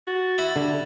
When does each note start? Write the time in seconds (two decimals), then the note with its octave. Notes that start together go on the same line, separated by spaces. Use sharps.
0.07 F#4 A6
0.38 E4 F#4 B5
0.56 D3 G3